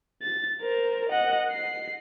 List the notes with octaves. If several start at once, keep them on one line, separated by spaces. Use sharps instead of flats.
A6
A#4 C5
D#5 F#5
C7